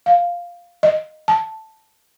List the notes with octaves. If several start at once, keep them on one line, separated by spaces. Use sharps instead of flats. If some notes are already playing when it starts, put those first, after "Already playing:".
F5
D#5
A5